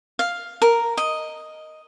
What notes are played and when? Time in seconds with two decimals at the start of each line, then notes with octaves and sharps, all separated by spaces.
0.19 F5
0.62 A#4
0.97 D#5